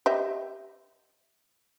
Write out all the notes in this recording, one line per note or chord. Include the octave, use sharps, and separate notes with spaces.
G4 D#5 E5